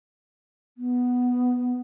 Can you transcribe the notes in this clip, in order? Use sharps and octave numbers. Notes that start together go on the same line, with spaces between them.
B3